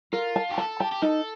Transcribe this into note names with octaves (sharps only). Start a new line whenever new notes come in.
F4 A#4
A5
G4
A4 A5
G4 A5
G4
D#4 A4